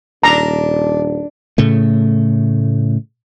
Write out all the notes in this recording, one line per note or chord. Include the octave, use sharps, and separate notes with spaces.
D#1 D4 A#5
A2 C#3 A3